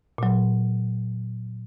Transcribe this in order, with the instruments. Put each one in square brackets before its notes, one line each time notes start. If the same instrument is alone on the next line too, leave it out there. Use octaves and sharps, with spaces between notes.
[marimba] A#2 F#3